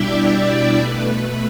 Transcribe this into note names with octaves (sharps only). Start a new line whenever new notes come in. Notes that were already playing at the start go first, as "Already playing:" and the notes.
Already playing: B2 G3 D4 E4 G4 D5 E5 G5
B2 A3 B4